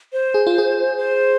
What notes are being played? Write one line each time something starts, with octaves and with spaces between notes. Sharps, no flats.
C5
G#4
F4
G#4
C5